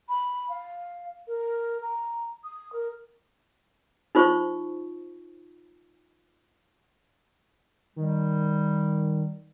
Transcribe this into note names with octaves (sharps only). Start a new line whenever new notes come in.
B5
F5
A#4
A#5
D#6
A#4
D#4 F4 C5 C#6
D#3 G3